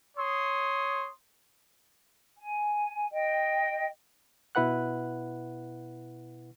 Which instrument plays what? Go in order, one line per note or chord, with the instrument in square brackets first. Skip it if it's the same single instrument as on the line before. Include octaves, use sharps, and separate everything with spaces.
[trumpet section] C#5 C6 D#6
[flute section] G#5
D#5 G5
[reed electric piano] B2 E4 B4 F#5 F#6